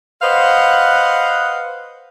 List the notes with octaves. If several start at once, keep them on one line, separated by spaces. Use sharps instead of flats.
B4 C5 D#5 F5 F#5